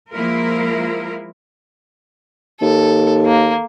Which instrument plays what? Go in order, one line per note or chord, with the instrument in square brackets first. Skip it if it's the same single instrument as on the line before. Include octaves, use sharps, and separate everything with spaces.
[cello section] F3 G#3 A#3 E4 F4 A#4
[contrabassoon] D#2 [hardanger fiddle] A4
[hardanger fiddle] A#3